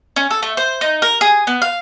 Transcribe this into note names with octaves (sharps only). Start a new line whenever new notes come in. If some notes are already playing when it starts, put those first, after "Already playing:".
C#4
A4
A3
C5
D#4
A#4
G#4
B3
F5